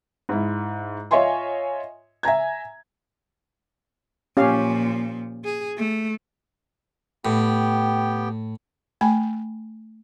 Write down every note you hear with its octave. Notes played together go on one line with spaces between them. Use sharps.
G#2 E4
F4 C#5 D#5 E5 G#5 C6
E5 G#5 A#5 G#6
A#2 F3 C#4 G4 F5
G#4
A3
A2 B3 G4 G5
A3 G#5 B5